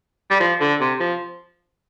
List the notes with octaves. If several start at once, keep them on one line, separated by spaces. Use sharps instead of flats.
G3
F3
D3
C3
F3